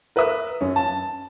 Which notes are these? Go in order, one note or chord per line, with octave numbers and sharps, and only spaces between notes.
A#4 B4 E5 D#6
F#2 C#4
A5